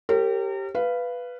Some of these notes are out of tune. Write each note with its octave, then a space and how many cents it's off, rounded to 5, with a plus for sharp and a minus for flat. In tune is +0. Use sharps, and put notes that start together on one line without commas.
G4 -5 A#4 -40 C#5 -45
B4 +0 F5 -15